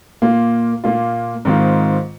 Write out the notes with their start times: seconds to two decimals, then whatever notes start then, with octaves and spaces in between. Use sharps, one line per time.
0.22 A#2 A#3 F4
0.84 A#2 A#3 F4
1.45 G#2 D#3 C4 F4